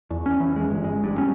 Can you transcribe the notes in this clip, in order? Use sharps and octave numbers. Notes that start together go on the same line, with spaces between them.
E2
C#4
E3
G#3
G1
G#3
G2
C#4